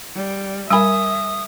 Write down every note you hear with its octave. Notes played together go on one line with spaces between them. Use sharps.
G3
G3 A#4 E5 G#5 B5 D#6